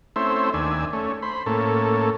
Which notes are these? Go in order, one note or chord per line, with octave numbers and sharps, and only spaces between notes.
A3 C4 C#4 E4 C5 E5
D#2 D4 E5 G#5
A3 C#4
C5 B5
A2 A#3 C#4 A4